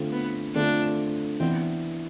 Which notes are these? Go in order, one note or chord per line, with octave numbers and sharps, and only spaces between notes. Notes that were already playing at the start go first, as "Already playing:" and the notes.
Already playing: D3 A3 C4 F4
B3
D3 A3 C4 D4 F4
E3 B3 C4 D4